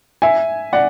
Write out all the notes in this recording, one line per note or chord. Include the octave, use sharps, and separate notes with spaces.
E5 G#5
D5 F#5